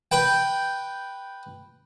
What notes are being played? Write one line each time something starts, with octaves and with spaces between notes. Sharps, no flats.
B4 G5